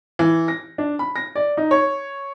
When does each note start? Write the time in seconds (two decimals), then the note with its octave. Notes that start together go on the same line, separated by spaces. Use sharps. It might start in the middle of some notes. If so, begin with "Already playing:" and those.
0.19 E3
0.48 A#6
0.78 D4
0.99 B5
1.16 A#6
1.36 D5
1.57 D#4
1.71 C#5